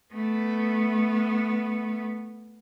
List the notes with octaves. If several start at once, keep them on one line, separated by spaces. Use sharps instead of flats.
A3 B3